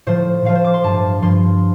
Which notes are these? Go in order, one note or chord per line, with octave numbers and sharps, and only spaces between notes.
A2 F3 C5
A2 F3 F5
C5
D6
C6
G2 F3 A5
G2 F3 C6